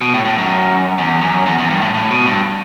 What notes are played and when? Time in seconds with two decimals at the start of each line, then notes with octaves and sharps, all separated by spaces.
0.01 B2
0.14 A2
0.25 A2
0.38 F#2
0.98 E2
1.21 F#2
1.46 E2
1.59 E2
1.70 G2
1.82 A2
1.94 A2
2.11 B2
2.26 G2